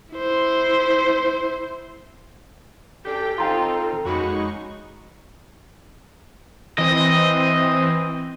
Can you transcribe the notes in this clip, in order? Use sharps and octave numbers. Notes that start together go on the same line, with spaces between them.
E4 C5
F#2 D4 G4 A4 G5
C4 D#4 F4 A4 G5 A#5 C6
F2 G#3 A#3 C#4 D#4 F#4 B5 C#6
E3 C4 D#5